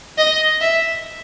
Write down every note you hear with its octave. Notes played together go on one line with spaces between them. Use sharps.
D#5
E5